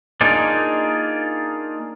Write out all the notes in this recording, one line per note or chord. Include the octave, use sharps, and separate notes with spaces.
A#3 D4 D#4 F4 G#4 D5